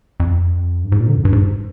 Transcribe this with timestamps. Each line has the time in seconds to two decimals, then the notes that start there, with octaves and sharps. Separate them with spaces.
0.20 F2
0.84 G2
0.92 G#2
1.00 A#2
1.08 D3
1.17 F2
1.25 G2
1.33 G#2
1.41 G2